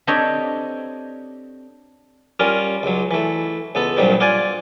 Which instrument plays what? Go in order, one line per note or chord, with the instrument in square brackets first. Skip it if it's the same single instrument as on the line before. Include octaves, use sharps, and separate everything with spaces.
[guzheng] C4 D4 G4 A4 C#5 D#5
[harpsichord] G3 C#4 F4 A#4
C#2 F#3
E3 A3
C#2 B3 A4
C2 G2 A#2 F#3 G3 C4
F4 D5 F#5 G#5